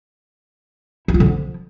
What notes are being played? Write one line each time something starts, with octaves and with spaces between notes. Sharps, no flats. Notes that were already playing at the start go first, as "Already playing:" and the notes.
E4
F4
D3
F3